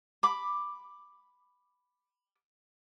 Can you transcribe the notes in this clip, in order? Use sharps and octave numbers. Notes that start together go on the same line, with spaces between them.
B5 D6